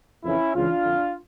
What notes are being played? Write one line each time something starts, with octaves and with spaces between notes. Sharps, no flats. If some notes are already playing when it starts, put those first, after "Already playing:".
F2 C#3 E3 C#4 E4
C#2 C#3 E3 D4 F4
F2 D3